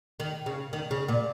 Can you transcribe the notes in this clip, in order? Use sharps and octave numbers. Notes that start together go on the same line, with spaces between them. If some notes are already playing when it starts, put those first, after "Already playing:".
D#3
C#3
D#3
C#3
A#2